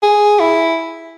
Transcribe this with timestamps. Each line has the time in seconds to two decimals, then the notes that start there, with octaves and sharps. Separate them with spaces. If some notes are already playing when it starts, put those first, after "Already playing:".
0.03 G#4
0.40 E4